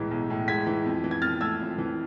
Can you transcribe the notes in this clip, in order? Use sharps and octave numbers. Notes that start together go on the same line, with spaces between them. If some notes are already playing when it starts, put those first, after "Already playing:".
Already playing: B1 A2 E3 G#3
B1
A2
G#3 G#6 B6
E3
F2
E3
G#6
F2 F6 A6
A3 E6 G#6
F2
E3